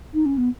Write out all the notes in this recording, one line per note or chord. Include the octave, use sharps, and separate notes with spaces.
D#4
C#4
B3